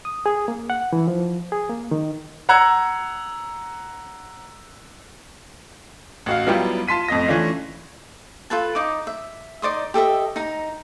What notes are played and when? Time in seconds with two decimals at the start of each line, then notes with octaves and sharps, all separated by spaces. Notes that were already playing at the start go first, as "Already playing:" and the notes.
0.05 D#6
0.26 G#4
0.48 A#3
0.70 F#5
0.93 E3
1.08 F3
1.52 G#4
1.69 A#3
1.91 D#3
2.49 F#5 A#5 E6 F#6 G#6 C#7
6.26 A1 F#4 F5
6.47 F#3 G3 B3 E4 F4 G4
6.88 F4 A5 C6 B6 D#7
7.08 F2 A2 D#5 A#6
7.28 E3 A3 C#4 D4 F4
8.50 F4 A4 B4 A5
8.75 D#4 D6 D#6
9.07 E5
9.62 D#4 D5 C6 D#6
9.94 G4 A4 D#5 E5
10.36 D#4 A#5